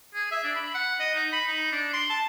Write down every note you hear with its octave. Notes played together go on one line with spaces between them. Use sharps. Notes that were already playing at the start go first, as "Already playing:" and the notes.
G#4
E5
D4
B5
F#5
D#5
D#4
B5
D#4
D4
C6
A5